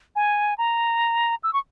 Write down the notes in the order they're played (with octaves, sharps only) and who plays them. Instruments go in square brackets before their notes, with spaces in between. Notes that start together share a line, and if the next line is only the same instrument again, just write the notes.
[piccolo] G#5
A#5
E6
C#6